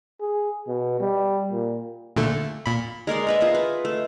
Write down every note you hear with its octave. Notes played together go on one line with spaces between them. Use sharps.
G#4
B2
G3
A#2
A#2 D3 A3
A#2 B5
G#3 A#4 D5 C6
A#4 B4 E5
F4 G#4 D#5 F#5
B4
A3